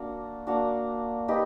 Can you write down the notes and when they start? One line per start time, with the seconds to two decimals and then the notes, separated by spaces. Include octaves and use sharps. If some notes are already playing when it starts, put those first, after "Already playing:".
Already playing: A#3 D4 F#4
0.47 A#3 D4 F#4
1.28 D#4 G4 B4 D#5